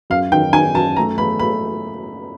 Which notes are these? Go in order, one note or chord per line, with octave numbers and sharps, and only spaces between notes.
F#2 F5
D#3 G5
D#3 G#5
F#2 A5
A3 A#5
A3 B5
A3 B5